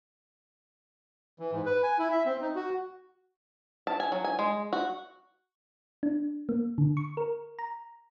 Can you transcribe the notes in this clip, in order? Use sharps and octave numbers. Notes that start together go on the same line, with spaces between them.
E3
G#2
B4
G#5
E4
E5
C4
D#4
F#4
A5
G#5
F#3
G#5
G#3
F#4
D4
A#3
D3
C#6
A#4
A#5